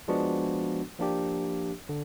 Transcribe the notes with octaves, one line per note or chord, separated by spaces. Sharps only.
F3 G#3 B3 D4 F#4
F3 A#3 D4 G4
D3